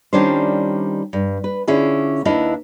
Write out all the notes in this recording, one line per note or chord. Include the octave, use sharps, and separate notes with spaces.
D#3 G3 C#4 D4 F4 C5
G2
B4
D3 C#4 E4 F4 G#4
D#2 D4 E4 B4 D#5 F5